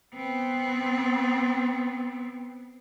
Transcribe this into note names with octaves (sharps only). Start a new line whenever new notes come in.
B3 C4